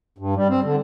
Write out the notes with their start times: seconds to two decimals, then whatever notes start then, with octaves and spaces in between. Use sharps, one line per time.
0.18 G2
0.36 G3
0.49 C4
0.64 D3